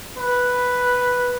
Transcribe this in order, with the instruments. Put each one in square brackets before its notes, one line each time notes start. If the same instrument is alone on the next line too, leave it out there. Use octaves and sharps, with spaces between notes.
[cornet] B4